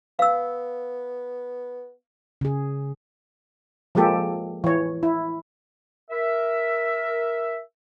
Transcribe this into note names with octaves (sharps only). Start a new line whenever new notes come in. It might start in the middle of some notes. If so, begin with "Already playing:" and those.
B3 F5 E6
C#3 G#4
F3 G#3 A#3 G4 A4
E3 C#5
E4
A#4 E5